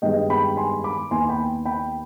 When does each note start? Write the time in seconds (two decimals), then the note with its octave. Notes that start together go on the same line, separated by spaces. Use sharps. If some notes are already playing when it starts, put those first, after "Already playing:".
0.02 G2 D#3 G#3 B3 D#5 G5
0.30 G5 B5
0.57 G#5 C6
0.84 B5 D6
1.11 D#2 D#3 B3 G#5 C6
1.29 G5 B5
1.65 G5 B5